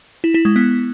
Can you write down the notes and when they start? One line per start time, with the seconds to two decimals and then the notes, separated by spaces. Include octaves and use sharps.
0.24 E4
0.34 E4
0.45 G#3
0.56 B3